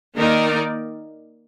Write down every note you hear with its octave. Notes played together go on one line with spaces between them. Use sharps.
D#3 A#3 D#4 A#4 D5